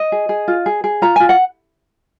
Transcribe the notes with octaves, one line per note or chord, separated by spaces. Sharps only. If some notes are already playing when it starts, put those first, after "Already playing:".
Already playing: D#5
G#4
G#4
F4
G#4
G#4
F4 A#5
F4 G#5
F#5